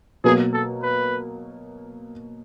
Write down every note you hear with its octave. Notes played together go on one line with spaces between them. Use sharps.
B2 F#3 A#3 G#4
A4
B4